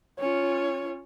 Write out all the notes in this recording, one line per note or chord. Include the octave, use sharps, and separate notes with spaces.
C#4 F4 C#5